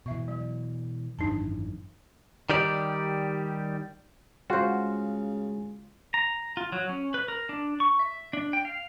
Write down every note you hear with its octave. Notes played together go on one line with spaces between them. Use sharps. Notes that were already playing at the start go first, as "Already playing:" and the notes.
B2 E3 E5 C#6
F#3
G#1 F#2 E3 D4 D#4 A5
D#3 G3 G4 D5
C#3 G#3 F4 F#4 C5
A#5
F4
F#3
C#4
B4
A#4
D4
C#6
E5
D4
G5
F5